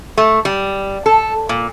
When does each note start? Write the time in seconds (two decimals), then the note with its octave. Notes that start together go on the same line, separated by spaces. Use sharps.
0.18 A3
0.45 G3
1.06 A4
1.49 A#2